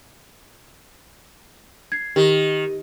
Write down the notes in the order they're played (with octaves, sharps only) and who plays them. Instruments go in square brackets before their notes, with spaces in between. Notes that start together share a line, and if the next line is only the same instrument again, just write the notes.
[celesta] G#6 C7
[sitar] D#3 [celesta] G4